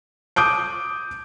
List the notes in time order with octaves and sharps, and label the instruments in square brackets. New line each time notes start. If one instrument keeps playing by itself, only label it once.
[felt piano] D6 D#6 G6 D7